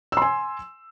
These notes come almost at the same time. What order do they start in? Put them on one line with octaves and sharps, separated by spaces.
E6 C6 G#5